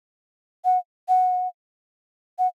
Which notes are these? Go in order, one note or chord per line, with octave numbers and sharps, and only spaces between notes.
F#5
F#5
F#5